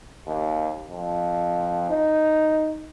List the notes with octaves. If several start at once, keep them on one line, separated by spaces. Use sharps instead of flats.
D#2
F2
D#4